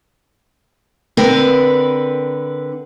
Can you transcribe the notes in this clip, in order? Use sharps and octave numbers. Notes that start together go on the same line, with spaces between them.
D3 C4 A#4 B4